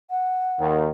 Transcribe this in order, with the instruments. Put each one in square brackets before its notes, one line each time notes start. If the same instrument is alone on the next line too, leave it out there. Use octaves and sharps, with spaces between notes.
[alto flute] F#5
[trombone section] D#2 D#3